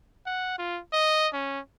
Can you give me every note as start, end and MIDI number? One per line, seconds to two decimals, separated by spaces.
0.27 0.54 78
0.59 0.81 65
0.93 1.28 75
1.33 1.60 61